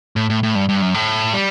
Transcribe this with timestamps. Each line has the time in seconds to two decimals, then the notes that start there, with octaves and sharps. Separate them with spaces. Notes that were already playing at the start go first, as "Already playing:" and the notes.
0.16 A2
0.30 A2
0.43 A2
0.55 G2
0.69 G2
0.82 F#2
0.94 A2
1.33 G3